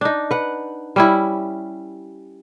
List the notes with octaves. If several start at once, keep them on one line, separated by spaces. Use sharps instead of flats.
D4 D#4
B4 F#5
G3 C#4 E4